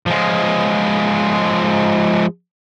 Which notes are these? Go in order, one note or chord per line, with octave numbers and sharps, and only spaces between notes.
F3 G#3